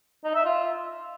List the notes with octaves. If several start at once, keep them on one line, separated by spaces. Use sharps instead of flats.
D#4
E5
F4